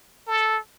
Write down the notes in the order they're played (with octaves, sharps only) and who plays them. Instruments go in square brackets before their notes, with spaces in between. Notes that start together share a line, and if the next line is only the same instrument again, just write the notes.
[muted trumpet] A4